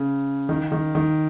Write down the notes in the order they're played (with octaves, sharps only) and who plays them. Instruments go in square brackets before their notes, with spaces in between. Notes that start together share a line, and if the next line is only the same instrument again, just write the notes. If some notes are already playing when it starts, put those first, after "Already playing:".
Already playing: [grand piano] C#3
D#3
D#3
D#3